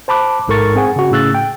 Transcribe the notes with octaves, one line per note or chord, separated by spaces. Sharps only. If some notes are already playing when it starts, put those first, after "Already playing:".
C5 A5 B5 D6 F#6
A1 G#2 A4 A#4 C#6 A6
C4 G#4 F#5 G#5
C#3 F#4
A2 C#3 E6 F#6 A6
G5